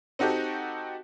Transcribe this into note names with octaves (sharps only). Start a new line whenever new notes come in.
C4 D#4 F#4 G4 A4